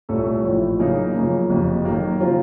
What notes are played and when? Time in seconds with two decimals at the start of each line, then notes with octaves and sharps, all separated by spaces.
0.09 C2 A#2 A3 C#4 A4
0.44 A1 A2 F3
0.79 C#3 F#3 A#3 D#4
1.15 F#2 C#3 F3 A#3
1.50 F#1 F2 C3
1.85 D#3 F#3 A#3
2.20 C#3 F#3 C4 F4